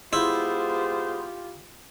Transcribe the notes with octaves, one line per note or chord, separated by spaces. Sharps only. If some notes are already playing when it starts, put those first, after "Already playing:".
G#3 B3 E4 F4 G4 C5